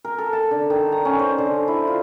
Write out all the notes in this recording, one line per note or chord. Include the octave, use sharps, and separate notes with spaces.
A#4
A4
A5
D3
D#3
A#5
C#4
C5
D3
E4
F4